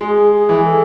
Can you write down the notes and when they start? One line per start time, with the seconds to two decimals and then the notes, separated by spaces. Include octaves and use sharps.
0.01 G#3 G#4
0.33 G#4
0.49 E3
0.64 A4